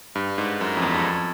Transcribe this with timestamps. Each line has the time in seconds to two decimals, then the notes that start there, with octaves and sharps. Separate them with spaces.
0.15 G2
0.38 G#2
0.61 F#2
0.77 F2
0.82 E2
0.94 F2